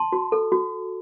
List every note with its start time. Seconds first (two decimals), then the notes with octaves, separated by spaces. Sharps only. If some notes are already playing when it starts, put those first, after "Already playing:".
Already playing: A5 C6
0.12 F#4
0.32 A4
0.52 F#4